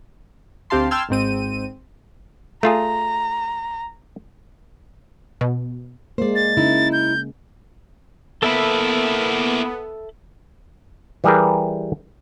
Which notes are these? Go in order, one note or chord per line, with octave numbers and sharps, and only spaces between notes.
D2 C4 G4 F5 A5 C6
G5 A5 C6 E6 F6 G#6
G#1 G#2 C4 D#7
A3 F4 G#4 A#5
B2
G#3 A#3 C5 D5
A6
C#3 D#4 E4
G6
A#3 B3 E4 A4 E5 B5
E3 G3 G4 G#4 A#4 B4